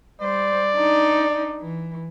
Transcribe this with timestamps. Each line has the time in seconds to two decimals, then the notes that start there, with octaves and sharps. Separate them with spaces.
0.21 G3 C5 D5
0.74 D4 D#4
1.61 E3